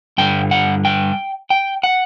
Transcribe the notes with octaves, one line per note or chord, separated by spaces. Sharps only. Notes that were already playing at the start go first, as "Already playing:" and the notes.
G2 D3 G3 G5
F#5
G5
G5
F#5